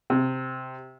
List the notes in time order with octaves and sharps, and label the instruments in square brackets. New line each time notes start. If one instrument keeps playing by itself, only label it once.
[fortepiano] C3